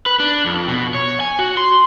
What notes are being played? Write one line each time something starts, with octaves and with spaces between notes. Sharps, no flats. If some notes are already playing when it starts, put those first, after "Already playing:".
B4
D4
F2
B2
C#5
G#5
F#4
C6